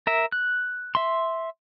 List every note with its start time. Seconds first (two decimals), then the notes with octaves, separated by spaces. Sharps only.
0.07 A#4 E5
0.32 F#6
0.95 E5 C6